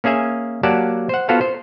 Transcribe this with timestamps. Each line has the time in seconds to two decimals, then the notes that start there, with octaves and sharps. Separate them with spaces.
0.04 A#3 C#4 G#4 E5 G#5
0.63 F#3 A#3 G4 D5 F#5 A5
1.09 C5 F#5
1.29 B3 F4 F#4 A4 C5 F5
1.41 C5